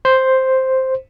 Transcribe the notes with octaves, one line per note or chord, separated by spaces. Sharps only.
C5